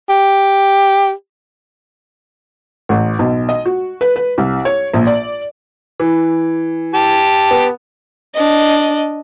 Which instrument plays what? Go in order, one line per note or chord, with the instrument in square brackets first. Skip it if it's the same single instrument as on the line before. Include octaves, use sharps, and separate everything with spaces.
[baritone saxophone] G4
[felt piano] A1
B1
D#5
F#4
B4
B4
C2
C#5
A#1
D5
[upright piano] E3
[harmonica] G4 A5
[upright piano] B3
[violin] D4 D#5